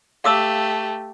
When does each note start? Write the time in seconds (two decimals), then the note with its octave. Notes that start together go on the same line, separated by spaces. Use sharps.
0.24 A3 G4 F5 D6 E6